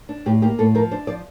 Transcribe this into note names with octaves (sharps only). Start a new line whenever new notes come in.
D4
A2 G4
A#3 G4
A2 A4
F3 A#4
D4 C5
F3 D5